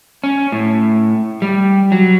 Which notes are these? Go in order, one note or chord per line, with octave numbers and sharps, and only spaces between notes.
C#4
A2
G3
F#3